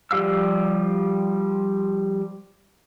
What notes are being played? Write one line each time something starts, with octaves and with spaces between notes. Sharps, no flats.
F3 G3 G4 F5 E6